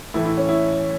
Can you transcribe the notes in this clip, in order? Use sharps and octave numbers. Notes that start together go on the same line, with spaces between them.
A2 E3 A3 E4
E4
C#4
E4